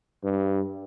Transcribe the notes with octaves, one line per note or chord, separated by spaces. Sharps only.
G2